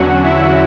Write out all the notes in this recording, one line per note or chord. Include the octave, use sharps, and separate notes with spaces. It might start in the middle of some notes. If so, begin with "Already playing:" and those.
Already playing: E2 D3 F#3 C#4 F#4 F#5
E4 E5